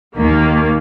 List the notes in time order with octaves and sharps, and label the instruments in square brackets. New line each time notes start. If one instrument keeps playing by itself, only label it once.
[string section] D#2 D#3 A#3